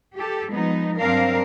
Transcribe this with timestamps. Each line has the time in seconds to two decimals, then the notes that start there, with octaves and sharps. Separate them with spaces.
0.16 G4 A4
0.51 F3 G#3 B3 D#4
0.99 G2 F#3 C4 D4 A#4 F5